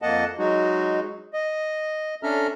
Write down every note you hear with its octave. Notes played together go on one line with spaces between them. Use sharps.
F2 A#3 D#5 F#5 A5
F#3 G#3 D#4 F#4
D#5
C#4 D4 A4 E5 A#5 F6